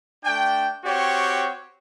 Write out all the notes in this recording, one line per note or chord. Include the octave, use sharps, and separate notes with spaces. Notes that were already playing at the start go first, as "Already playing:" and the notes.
A3 D4 G5
C4 F#4 G4 C#5